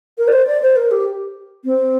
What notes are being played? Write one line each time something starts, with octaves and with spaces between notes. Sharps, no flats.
A#4
D5
C5
D5
C5
A#4
G4
C4